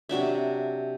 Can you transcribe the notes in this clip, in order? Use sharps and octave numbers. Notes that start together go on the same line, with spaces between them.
C3 F#3 D4 E5